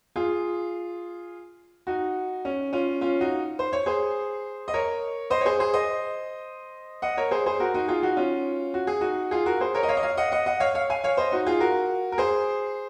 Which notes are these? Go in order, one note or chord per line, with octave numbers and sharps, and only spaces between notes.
F4 G#4
D#4 F#4
C#4
C#4 F4
C#4 F4
D#4 F#4
C5
C#5
G#4 C5
D#5
A#4 C#5
C5 D#5
C#5
G#4 C5
G#4 C5
C5 D#5
D#5 F#5
A#4 C#5
G#4 C5
G#4 C5
F#4 A#4
D#4 F#4
F4 G#4
D#4 F#4
C#4 F4
F#4
G#4
D#4 F#4
F4 G#4
F#4 A#4
G#4 C5
A#4 C#5
D#5
C#5 F5
D#5
C#5 F5
D#5 F#5
D#5 F#5
D#5 F#5
C#5 F5
C#5 F5
F5 G#5
C#5 F5
C5 D#5
D#4 F#4
F4 G#4
F#4 A#4
A#4
G#4 C5